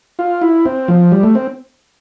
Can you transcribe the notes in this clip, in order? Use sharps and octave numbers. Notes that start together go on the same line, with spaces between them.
F4
E4
C4
F3
G3
A3
C4